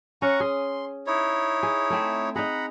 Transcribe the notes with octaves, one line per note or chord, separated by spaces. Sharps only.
C#4 F#5 A#5 C#6
G#4 C6
D#4 E4 C#5
G#4
A3 C4
D#4 G#4 F#5 A#5 B5